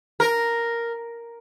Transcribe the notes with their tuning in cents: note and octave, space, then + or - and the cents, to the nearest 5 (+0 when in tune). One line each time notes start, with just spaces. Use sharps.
A#4 +0